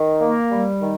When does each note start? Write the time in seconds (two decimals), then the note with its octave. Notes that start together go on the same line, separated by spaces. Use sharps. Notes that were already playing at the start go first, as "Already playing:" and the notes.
Already playing: D#3
0.21 A#3
0.51 G3
0.82 D#3